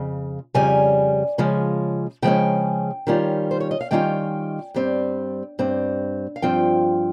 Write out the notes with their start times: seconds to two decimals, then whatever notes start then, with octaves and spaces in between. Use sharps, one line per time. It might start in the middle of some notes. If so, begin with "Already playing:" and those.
Already playing: F2 C#3
0.54 F2 C#3 G3 C#4 G#5
1.38 C#3 F3 G#3 C#4
2.22 C#3 F3 G#3 C#4 G5
3.07 D#3 G3 C#4 F4
3.51 C5
3.60 C#5
3.71 D#5
3.81 F5
3.91 D#3 G3 C#4 F4 G5
4.74 G2 G3 C4
5.59 G2 G3 C4
6.36 F5
6.42 G2 F3 C4 F4 G5